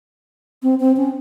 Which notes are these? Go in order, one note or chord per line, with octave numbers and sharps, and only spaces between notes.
C4
C4
C#4